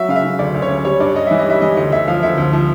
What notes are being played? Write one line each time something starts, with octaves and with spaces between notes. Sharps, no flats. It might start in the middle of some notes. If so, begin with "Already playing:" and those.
Already playing: F#3 E5
C#3 F5
E5
C#3
D2 D5
D2
C#5
C#3
G3 C#5
G2 D5
G3 D#5
E3 E5
D#5
G3 E5
E3 D#5
D2 D#5
D2 E5
F3 F5
D2 E5
D2
F3